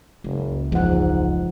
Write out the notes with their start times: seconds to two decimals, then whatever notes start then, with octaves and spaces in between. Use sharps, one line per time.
0.24 F#1 C#2
0.72 F#1 E2 G#2 F3 F#5